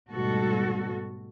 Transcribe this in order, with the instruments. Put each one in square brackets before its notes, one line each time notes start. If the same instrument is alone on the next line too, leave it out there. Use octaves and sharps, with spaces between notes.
[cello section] D2 G#2 B2 G3 F#4 A4